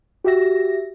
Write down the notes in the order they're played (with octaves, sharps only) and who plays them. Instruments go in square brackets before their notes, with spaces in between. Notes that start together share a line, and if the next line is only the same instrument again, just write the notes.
[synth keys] F#4 G4 E5 A#6